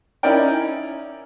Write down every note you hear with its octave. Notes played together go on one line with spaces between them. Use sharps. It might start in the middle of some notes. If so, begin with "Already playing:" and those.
C#4 D#4 E4 A#4 D5 G5